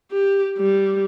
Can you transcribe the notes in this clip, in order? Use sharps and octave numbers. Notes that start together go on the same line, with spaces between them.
G4
G3